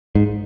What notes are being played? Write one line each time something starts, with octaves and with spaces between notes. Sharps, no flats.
G#2